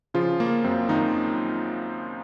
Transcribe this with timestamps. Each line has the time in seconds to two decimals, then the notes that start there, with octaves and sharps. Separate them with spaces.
0.14 C#3 F3 F4
0.40 C#3 A#3
0.64 F#2 C4
0.89 F#2 D#3 D#4